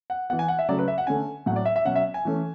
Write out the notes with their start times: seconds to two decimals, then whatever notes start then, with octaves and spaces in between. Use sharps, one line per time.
0.10 F#5
0.30 B3 F#5
0.33 E3
0.39 G#5
0.48 F#5
0.59 E5
0.68 C#3 F#3 A3 D5
0.79 B4
0.88 E5
0.98 F#5
1.07 D3 A3 C#4 G#5
1.46 A2 F#3 A3 F#5
1.56 D5
1.65 E5
1.76 E5
1.85 B2 F#3 C#4 F#5
1.96 E5
2.14 G#5
2.25 E3 A3 C#4